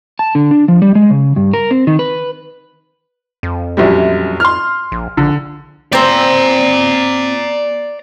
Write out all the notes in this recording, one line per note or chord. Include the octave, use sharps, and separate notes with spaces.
A5
D3
D4
F3
G3
G#3
C#3
G2
A#4
C4
D#3
B4
F2
A#1 F#2 G3
C6 F6
A#1
A#1 D3
C4 C5 D5 A#5